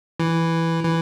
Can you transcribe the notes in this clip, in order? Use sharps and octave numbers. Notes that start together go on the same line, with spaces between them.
E3
E3